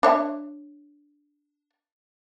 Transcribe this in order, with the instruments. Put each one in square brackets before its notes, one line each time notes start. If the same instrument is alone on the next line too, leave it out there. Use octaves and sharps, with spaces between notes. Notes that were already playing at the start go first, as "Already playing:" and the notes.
[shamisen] D4 C#5 E5